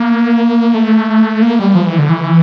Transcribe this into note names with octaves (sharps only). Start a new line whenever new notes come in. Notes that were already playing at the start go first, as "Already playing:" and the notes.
Already playing: A#3
A3
A#3
G3
F3
E3
D3
E3